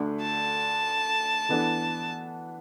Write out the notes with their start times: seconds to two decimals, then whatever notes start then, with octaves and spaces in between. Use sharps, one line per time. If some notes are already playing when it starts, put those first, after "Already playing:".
Already playing: D2 D3 A3 D4
0.21 A5
1.49 E3 B3 D4 A4